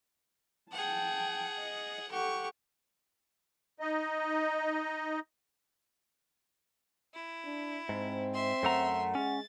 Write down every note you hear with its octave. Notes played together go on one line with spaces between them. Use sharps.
G#4 F#5 G5 A5
D#5
G4 A4 F#5 C#6
D#4 D#5
E4
D4
G#2 C4
E5 C6
F#2 A3 F#5 A#5
G#3 C#4 A6